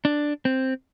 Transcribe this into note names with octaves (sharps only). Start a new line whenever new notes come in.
D4
C4